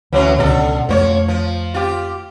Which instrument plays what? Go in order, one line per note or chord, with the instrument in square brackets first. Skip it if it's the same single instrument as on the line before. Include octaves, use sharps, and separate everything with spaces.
[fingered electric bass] D2 [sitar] E3 F#3 C#4
[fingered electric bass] C#2 B2 [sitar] D3 A4
[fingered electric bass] F2 A3 [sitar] F3 C5 C#5
[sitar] F3
F4 G4